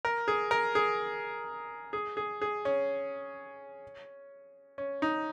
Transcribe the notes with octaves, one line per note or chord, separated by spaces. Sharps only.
A#4
G#4
A#4
G#4
G#4
G#4
G#4
C#4
C#4
D#4